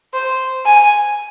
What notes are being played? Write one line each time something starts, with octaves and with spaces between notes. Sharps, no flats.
C5
G#5